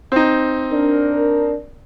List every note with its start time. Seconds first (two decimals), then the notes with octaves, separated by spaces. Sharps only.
0.12 C4 D#4
0.71 D4 A#4